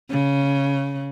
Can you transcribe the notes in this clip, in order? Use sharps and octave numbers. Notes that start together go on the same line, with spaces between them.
C#3